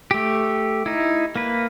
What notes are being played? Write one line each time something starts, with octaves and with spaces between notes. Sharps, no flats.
A3 G4
D#4 E4
A#3 B4